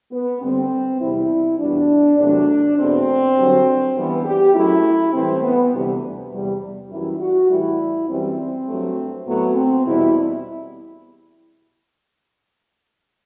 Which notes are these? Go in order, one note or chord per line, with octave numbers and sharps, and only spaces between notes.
B3
G2 D3 G3 C4
E2 C3 G3 E4
E2 B2 G3 D4
E2 C3 F#3 A3 D4
E2 B2 A3 C4
G2 D3 F#3
G2 E3 G3 B3
G4
F#2 F#3 A3 E4
A2 E3 G3 C4
B3
D2 C3 E3 G3
E2 C3 G3
F#2 E3 G3 E4
F#4
A2 E3 G3 E4
F#2 E3 G3 C4
G2 F#3 A3
A2 F#3 A3 B3
C4
E2 B2 G3 E4